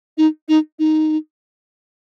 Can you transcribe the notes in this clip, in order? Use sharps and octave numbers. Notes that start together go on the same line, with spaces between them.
D#4
D#4
D#4